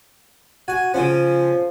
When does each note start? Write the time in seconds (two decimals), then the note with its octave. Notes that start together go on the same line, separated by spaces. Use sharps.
0.68 F#4 G#5
0.94 C#3 F3 C#4